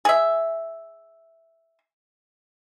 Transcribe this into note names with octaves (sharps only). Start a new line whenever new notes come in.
G#4 E5